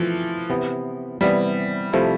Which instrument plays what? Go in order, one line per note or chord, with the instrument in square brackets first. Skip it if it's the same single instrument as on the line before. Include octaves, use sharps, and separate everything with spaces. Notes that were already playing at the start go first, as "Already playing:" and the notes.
Already playing: [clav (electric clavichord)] B2 A3 C4 E4 [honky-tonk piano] E3 F3
[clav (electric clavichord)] C3 E3 B3
[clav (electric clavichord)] C3 E3 B3 [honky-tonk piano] G3
[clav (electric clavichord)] C3 F3 A3 E4